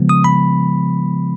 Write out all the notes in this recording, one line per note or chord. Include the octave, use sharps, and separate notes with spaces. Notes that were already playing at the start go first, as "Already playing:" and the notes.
Already playing: C#3 F3 G#3 B3
D#6
B5